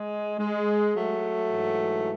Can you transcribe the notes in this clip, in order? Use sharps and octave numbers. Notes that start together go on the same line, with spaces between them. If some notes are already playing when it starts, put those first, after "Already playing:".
Already playing: G#3
G#3
F#3 A3
G#2 E3